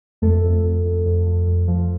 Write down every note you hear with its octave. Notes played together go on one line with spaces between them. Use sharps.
F2 A3 A4
F2
F2
F2
F2
F2
F2
F3